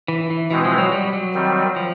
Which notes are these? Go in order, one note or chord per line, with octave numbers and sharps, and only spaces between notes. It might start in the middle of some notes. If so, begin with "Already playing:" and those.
E3
E3
B2 E3 G#3 C4
F3
F#3
G3
F#3
D#3 G3 C4
F3